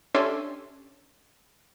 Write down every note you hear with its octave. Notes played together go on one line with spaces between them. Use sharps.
C#4 D4 G4 A4 E5 C6